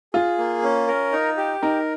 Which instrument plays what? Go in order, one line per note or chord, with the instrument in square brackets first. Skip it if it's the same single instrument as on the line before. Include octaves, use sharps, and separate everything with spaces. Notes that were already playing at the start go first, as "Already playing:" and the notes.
[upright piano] F4 [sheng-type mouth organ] G#4
[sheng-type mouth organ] A#3
C#4
A#4
D#4
G4
[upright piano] D#4 [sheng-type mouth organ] A#4